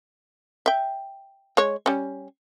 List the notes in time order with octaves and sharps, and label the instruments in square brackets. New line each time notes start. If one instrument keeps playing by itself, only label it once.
[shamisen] E5 G5
G#3 C#5
G3 C#4